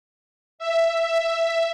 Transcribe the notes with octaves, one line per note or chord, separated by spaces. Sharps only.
E5